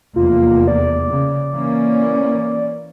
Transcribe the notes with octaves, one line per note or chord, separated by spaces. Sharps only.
F1 E2 A#3 F4
D5
C#3
E3 A#3 C#4